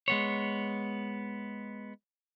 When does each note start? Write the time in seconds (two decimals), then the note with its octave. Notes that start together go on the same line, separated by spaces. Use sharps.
0.08 G#3 B3 C#5